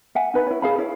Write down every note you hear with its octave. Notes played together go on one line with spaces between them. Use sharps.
E5 F#5 G#5
D#4 B4 B5
E4 C#5
G#4 F5 B5
E4 C#5